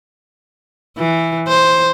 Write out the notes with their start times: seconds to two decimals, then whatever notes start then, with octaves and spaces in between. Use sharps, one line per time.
0.98 E3
1.48 C5